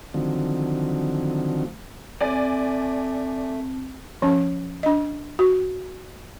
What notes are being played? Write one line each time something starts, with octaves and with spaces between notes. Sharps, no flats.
D3 D#3 F3 F#3 A3 C4
A3 C4 D5 G#5 A5 A6
F3 C#4
D4 D#5
F#4